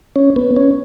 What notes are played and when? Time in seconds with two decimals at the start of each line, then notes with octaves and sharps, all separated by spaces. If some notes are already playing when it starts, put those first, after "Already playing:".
0.16 C#4
0.36 B3
0.56 C#4